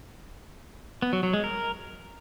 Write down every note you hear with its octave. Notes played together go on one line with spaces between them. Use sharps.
B3
F#3
F#3
G#3
A#4